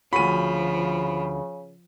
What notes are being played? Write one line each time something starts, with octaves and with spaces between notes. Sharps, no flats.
D2 C#3 F3 F#4 B5 D#7